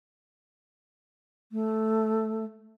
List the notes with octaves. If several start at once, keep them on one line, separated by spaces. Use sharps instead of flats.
A3